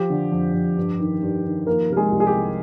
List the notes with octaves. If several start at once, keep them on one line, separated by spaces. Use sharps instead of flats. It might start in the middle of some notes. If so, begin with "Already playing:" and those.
Already playing: F3 G4
D3
F2
F2
G2
D#3
G2
D#3
F3 A#3 A#4
C3 A#4
G#3 G#4
C2
G#4
G4
C2